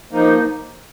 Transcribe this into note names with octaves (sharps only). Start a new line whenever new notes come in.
F3 A#3 D#4